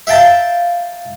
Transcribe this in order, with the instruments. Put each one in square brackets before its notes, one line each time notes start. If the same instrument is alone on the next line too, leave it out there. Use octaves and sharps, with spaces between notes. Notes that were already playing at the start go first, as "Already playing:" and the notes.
[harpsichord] E5 F5 G5 A5 A#5